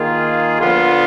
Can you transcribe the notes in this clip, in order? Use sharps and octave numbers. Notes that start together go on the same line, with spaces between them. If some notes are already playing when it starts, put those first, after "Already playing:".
Already playing: D#3 A#3 F4 G#4
D3 F3 B3 F4